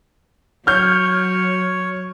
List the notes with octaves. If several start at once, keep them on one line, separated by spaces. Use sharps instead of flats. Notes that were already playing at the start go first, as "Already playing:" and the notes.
F#3 C#5 F6 G6